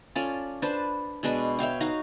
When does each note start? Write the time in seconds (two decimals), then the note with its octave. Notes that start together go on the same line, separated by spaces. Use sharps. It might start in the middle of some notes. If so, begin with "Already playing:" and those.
0.16 C#4 F4 A4 D5
0.62 D4 B4 C5 A5
1.23 B2 G#3 D4 B4
1.59 C#5 E5 F5 G5
1.80 D#4 F#4 F5 A#5